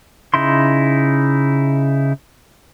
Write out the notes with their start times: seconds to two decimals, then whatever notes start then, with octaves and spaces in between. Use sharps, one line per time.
0.34 C#3 D#4 E4 C6